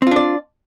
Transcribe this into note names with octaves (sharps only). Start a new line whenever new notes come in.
C4 D4 F4 D5